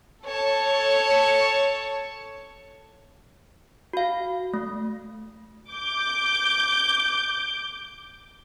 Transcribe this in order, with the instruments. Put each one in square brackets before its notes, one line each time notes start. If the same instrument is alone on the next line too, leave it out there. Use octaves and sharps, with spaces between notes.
[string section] A4 C#5 A5
[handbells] F#4 F5
A3
[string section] D6 G6